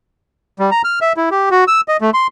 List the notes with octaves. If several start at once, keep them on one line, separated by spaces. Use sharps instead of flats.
G3
A#5
F6
E5
E4
G4
F#4
E6
D#5
A3
C6